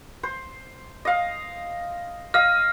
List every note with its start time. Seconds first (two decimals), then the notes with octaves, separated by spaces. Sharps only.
0.23 C5
1.05 D#5 F5
2.34 D#5 F5 F6